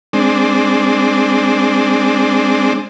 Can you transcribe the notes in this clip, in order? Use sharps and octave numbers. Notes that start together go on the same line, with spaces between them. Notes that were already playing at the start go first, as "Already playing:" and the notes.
G#3 C4 D4